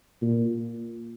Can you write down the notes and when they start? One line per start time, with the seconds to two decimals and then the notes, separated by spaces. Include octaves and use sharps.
0.22 A#2